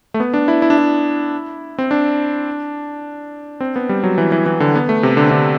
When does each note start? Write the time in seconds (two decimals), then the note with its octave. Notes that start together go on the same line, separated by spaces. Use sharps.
0.14 A3
0.20 B3
0.34 D4
0.48 E4
0.62 E4
0.70 D4
0.78 E4
1.78 C4
1.91 D4
3.60 C4
3.76 B3
3.89 G3
4.03 F#3
4.18 E3
4.32 E3
4.46 E3
4.60 D3
4.75 B3
4.89 A3
5.03 C3
5.17 D3
5.31 D3